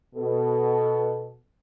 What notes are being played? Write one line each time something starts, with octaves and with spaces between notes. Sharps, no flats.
B2 A4